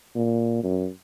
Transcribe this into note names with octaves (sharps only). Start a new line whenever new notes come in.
A#2
F#2